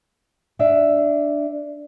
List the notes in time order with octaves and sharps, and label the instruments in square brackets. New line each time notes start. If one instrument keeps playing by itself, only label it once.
[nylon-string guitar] D4 D5 E5